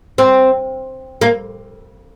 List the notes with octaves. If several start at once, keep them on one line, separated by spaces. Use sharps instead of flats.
C4
A#3